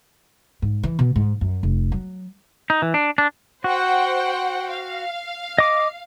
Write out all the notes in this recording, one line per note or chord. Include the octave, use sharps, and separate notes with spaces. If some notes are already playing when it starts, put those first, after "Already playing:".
G#2
E3
B2
G#2
F#2
F1
F#3
D#4
E3
D4
D4
F#4 C5 F#5 G5
F5
D#5 D6